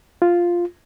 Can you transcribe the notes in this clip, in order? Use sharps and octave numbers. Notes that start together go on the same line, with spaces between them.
F4